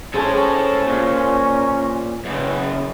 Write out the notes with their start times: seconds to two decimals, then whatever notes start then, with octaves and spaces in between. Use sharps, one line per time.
0.14 C#4 G#4 A4 C5 C#5 A5
0.88 A#2
2.25 F#2 C#3 B3